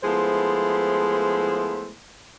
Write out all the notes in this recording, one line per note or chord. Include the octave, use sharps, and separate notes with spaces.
F3 G#3 A3 B3 E4 C5